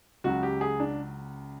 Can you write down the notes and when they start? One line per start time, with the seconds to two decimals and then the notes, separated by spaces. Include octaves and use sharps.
0.24 C#2 C#3 F#3 F#4
0.43 G4
0.61 G#4
0.80 D4